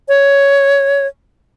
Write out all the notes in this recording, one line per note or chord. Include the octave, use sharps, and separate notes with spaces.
C#5